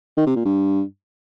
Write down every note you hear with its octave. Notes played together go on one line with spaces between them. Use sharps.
D#3
C3
A#2
G2